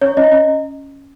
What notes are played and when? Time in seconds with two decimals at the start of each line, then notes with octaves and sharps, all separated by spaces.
0.01 C#4 C#5
0.17 C#4 D#5
0.32 C#4